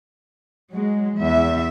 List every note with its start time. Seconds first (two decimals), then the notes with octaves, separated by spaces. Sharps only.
0.73 F#3 G#3
1.18 E2 E5